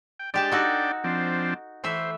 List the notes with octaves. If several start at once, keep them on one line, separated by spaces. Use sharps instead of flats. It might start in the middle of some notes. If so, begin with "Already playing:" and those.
G5
G#3 D4 G4 D5 G5 A5
D#4 F#4 A4
F3 C4 D4
E3 A3 C5 E5